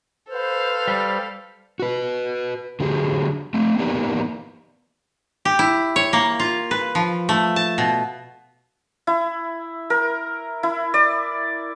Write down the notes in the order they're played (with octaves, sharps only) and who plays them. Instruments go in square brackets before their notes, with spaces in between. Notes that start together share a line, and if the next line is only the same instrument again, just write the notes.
[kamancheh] A4 F5 [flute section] B4 C5
[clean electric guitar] G3
[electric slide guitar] F#4 B4
D3 F#3 G4 G#4
A3 C4
A#3 B3 D#4 G4 A#4 D5
[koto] G4
E4
C#5
A#3
F4
B4
F3
A3
A5
B2
[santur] E4
A#4
E4
D5